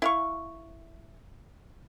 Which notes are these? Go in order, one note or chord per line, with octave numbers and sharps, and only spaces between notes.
E4 F5 C#6